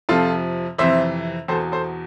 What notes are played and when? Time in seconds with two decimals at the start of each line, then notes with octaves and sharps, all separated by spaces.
0.09 F2 C3 F3 F4 A4
0.78 F2 C3 E3 C5 E5
1.48 E2 B2 A4 C5
1.72 A4 C5